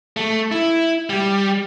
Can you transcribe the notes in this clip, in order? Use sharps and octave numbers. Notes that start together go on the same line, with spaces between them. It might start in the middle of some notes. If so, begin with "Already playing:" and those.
A3
E4
G3